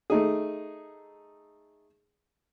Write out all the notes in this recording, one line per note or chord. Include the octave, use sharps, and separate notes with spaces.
A3 D#4 G#4